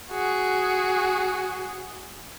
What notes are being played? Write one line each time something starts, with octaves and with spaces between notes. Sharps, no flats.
F#4 G#4